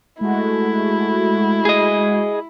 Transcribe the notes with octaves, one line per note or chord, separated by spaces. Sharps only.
G#3 A3 E4 F#4
G#4 D#5